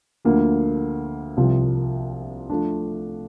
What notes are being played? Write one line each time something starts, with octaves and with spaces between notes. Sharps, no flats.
D2 D3 F3 A#3
C2 C3 F3
F3 A3 D4